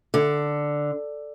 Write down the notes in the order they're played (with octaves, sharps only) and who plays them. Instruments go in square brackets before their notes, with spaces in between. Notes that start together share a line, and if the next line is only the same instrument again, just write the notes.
[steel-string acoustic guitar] D3